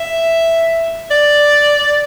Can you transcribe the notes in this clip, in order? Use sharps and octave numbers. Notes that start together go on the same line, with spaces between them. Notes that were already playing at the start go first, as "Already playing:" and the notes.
Already playing: E5
D5